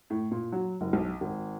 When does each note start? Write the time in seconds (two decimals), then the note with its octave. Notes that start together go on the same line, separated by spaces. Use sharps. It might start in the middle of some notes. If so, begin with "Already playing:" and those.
0.10 A2
0.31 A#2
0.52 F#3
0.81 F#1
0.93 B1
1.21 G#1